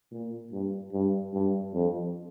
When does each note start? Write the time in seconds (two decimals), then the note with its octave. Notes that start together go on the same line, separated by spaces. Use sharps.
0.11 A#2
0.52 G2
0.93 G2
1.33 G2
1.74 F2